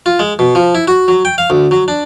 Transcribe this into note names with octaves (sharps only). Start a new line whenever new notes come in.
F4
G#3
B2
F3
E4
F#4
F#3
G5
F5
D2
F#3
D4